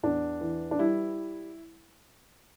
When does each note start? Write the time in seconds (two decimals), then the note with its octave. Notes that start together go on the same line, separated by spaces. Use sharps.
0.03 E2 D4
0.41 E3
0.71 D4
0.79 G3 E4